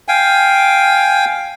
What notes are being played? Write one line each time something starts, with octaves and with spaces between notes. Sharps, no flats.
F5 G5 G#5